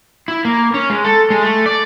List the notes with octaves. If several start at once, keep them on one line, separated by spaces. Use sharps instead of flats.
E4
A#3
C#4
G#3
A4
G#3
A3
D5